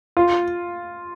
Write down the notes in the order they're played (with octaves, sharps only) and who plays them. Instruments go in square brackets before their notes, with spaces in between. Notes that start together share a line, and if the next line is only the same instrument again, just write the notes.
[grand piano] F4